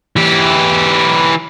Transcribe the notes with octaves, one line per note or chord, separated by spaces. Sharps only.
E3 G4